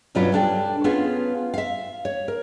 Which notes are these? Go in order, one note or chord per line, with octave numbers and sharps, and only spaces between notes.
G2 B2 F#3 C#4 F4 B4
G3 D4 A4 G5
B3 C#4 F4 G#4 F5
E5 F5
C#5
A#4